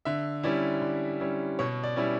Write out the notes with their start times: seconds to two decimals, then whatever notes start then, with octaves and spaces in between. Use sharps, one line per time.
0.05 D3 E5
0.43 G3 C#4 E4 D5
0.82 D3
1.20 G3 C#4 E4
1.59 B2 C#5
1.84 D5
1.97 G3 C#4 E4